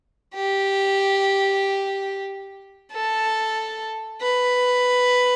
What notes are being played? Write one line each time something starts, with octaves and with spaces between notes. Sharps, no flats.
G4
A4
B4